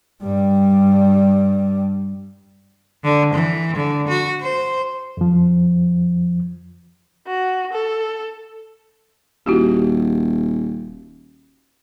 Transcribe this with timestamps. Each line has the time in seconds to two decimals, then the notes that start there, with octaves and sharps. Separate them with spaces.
0.23 G2 G3
3.04 D3
3.34 E3
3.77 D3
4.08 F#4
4.41 C5
5.17 F2 F3
7.27 F#4
7.73 A4
9.46 D#1 E4 F#4 G4